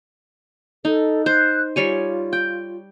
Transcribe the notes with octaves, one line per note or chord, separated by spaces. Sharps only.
D#4 A4
C5 F#6
G3 F4 C#5 G#5
G5